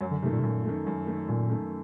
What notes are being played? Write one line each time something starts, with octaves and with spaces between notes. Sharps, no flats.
F#2 F#3
D3
C3 D#3 A3
A#2
C3
F#2 A#2
D#3 A3
F#2
D#3 A3
F#2 A#2
D#3 A3